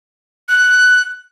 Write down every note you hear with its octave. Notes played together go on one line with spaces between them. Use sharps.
F#6